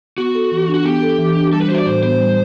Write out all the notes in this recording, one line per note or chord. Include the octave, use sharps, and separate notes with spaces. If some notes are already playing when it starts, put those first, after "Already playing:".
B3 F#4
A4
E3
D4
F#4
B3 G4
A4
E3
D4
G3 A4
B4
F#4 C5 E5
D5
A2 C5
B3 C5
G3